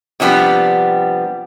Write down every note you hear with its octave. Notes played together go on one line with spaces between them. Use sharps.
C3 F3 G3 B3 D4